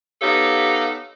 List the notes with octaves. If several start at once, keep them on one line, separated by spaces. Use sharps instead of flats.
B3 D#4 G4 A4 C#5 F5